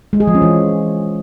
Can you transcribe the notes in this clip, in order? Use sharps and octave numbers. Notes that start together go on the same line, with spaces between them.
G#3
G#4
F3
C#4
E3